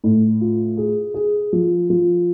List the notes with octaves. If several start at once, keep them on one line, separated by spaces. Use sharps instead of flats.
A2
F4
G#4
G#4
F3
F3